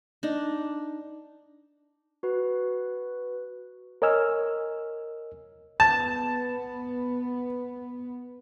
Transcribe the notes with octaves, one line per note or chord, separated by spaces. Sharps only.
D4 D#4
F#4 B4
A#4 C#5 D#5 G#5 E6 F6
B3 A5